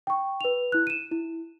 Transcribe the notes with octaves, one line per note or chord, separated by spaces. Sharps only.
G5 C#6
B4 F7
E4 F#6
D#7 E7
E4